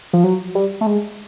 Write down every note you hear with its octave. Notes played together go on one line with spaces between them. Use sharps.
F3
F#3
G3
A3
G#3